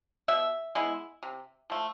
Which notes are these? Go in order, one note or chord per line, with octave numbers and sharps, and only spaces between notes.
B2 E5
G#3 B3 E4
C3
F3 A3